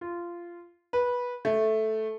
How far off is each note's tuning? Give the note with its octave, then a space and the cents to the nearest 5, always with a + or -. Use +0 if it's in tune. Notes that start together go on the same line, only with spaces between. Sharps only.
F4 -15
B4 -15
A3 -5